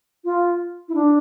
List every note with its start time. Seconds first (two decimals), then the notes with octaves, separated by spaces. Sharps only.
0.25 F4
0.89 E4
0.94 D4